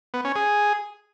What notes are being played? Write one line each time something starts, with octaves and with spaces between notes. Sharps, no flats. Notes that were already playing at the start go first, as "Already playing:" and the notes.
B3
C#4
G#4